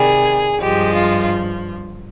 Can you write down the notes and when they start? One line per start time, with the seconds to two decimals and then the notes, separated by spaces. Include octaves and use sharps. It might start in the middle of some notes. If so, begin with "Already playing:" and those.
Already playing: C3 D#3 G3 G#4
0.61 G2 F3 G#3 G4
0.95 F4